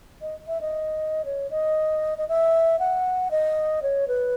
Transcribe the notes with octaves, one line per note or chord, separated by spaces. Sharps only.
D#5
E5
D#5
C#5
D#5
D#5
E5
F#5
D#5
C#5
B4